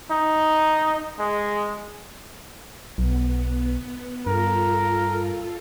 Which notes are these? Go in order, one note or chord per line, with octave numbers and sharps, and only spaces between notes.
D#4
G#3
B1 B3
G2 F4 A4 A#4